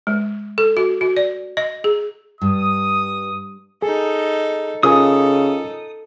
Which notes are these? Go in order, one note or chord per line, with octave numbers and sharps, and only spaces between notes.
G#3
A4
F#4
F#4
D5
D#5
G#4
G2 D#6
D#4 G#4 A4
C#3 D#4 F4 A4 A#4 G#5 D#6